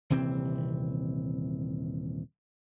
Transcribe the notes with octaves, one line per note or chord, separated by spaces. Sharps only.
D#1 C3 E3 C4